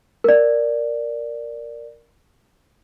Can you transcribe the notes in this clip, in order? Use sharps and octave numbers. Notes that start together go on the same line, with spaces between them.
A#4 D5